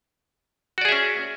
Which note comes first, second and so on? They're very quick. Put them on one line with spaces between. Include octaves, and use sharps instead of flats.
F#4 D5 G#4 E5 C#4